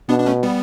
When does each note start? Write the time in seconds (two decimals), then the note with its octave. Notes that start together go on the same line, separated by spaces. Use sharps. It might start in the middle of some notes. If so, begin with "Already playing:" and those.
0.09 B2 B3 D4
0.20 D4
0.26 A3 C#4
0.43 G3 B3